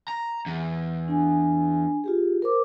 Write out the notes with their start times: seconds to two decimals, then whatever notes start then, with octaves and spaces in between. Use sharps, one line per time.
0.08 A#5
0.46 E2
1.08 D4 G#5
2.04 F4 G4 G#4
2.42 A#4 C5 D6